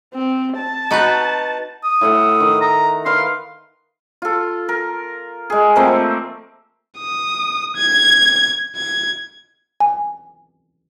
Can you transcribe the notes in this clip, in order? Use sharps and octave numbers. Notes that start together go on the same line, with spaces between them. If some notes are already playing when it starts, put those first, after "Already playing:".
C4
A5
D#4 F#4 B4 D#5 F#6
D#6
A2 E5 F#5
D#3
A#5
A#4 B4 F5 C6
F4 A4
A#4
G#3 G#4
F3 A3 A#3 C4
D#6
G#6
G#6
G#5